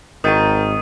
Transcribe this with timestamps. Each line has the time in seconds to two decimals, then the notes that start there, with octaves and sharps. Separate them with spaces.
0.24 G#1 D#3 A#4 C#6 D#6 G6 A6 D#7